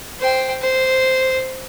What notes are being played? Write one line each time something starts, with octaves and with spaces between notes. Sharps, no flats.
C5 G5
C5